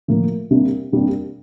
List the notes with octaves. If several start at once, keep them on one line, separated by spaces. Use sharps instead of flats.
A2 F3 A#3
C3 G3 A#3 D4
C3 G3 A#3 D4